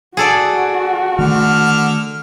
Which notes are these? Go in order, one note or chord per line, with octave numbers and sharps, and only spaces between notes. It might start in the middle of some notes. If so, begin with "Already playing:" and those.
F#4 G#4 A4 D5
D3 D#3 A3 F6